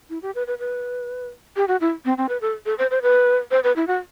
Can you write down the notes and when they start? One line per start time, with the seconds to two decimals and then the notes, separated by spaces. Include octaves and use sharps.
0.10 E4
0.22 G4
0.35 B4
0.47 B4
0.59 B4
1.56 G4
1.68 F#4
1.81 E4
2.05 C4
2.18 C4
2.29 B4
2.41 A4
2.66 A4
2.78 C5
2.91 C5
3.02 B4
3.51 C5
3.64 B4
3.76 E4
3.87 F#4